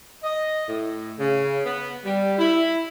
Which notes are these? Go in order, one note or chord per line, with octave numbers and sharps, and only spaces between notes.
D#5
A2
C#3
B3
G3
E4